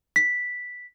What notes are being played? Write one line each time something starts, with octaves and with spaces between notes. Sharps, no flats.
B6